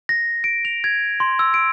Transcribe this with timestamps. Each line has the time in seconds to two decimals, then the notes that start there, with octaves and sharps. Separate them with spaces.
0.09 A#6
0.44 D7
0.65 F7
0.84 G#6
1.20 C6
1.39 E6
1.54 D7